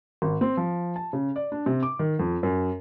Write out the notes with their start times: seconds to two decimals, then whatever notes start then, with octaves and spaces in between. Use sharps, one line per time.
0.22 G#1
0.41 C4
0.57 F3
0.96 A5
1.13 C#3
1.36 D5
1.52 D4
1.66 C3
1.83 D6
1.99 D#3
2.19 F2
2.43 F#2